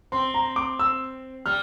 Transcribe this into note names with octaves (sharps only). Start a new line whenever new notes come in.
C4 C6
A#5
D6
E6
G3 F6